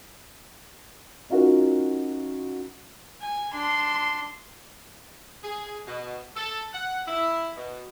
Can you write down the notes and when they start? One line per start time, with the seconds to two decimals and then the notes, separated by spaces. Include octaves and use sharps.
1.30 C#4 D#4 F4 F#4 A#4
3.22 G#5
3.54 D4 C6
5.43 G#4
5.86 B2
6.36 A4
6.73 F#5
7.07 E4
7.56 B2